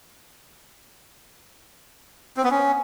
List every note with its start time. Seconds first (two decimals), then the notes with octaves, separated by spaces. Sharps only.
2.37 C4
2.44 B3
2.51 C#4